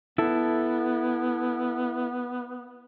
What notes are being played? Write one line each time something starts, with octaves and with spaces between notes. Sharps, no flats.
B3 E4 A4